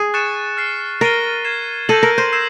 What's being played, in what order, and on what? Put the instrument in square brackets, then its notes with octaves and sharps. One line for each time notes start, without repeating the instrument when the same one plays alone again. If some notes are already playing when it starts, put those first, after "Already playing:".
Already playing: [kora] G#4
[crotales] C#6 F#6 A6 C#7 E7
F6 A6 C7
[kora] A#4 [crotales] A6 C7 D#7 G7
[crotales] G#6 C7 E7
[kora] A4 [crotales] G6 A#6 D#7 F#7
[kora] A#4
C5
[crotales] E6 G#6 C7 E7